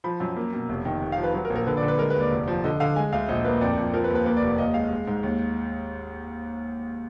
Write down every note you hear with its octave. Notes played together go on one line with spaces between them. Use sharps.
F3 B5
F#2
A#3
B2
F1
D#3
F1
F5
F3
B4
F#3 B4
A#4
A#1
A#4
D3 B4
D5
D3
B4
G#3 A#4
D#2 B4
D5
F1
F3
D3 D#5
D3 F5
G#3 G#5
D2 F5
A#1 D#5
A#3 B4
F2 D5
F2
F3 A#4
B4
D#2
B4
A#3 B4
D5
F1
D#2 D#5
G#3 F5
G#3
G#2
D#2